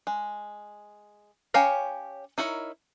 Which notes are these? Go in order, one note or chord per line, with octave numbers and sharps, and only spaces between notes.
G#3
C#4 G4 C#5 F5 A#5
D#4 E4 A#4 C#5